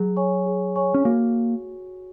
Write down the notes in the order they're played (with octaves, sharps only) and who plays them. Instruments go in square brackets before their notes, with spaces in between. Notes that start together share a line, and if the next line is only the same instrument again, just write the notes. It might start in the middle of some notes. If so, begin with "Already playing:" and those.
Already playing: [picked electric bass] F#3 [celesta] G#4
[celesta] C#5 G#5 C#6
G#4
C#5 G#5 C#6
[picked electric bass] C#4
[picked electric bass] A#3 [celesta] F#4